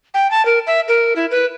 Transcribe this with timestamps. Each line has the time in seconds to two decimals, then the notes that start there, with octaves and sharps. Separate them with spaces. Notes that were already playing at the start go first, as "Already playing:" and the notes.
0.14 G5
0.31 A5
0.45 A#4
0.67 E5
0.88 A#4
1.16 E4
1.31 B4